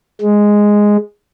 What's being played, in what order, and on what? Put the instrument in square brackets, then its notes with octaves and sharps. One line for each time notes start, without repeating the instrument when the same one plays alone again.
[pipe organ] G#3